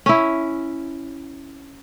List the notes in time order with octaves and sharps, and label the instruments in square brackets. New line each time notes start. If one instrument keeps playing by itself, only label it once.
[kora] C#4 E4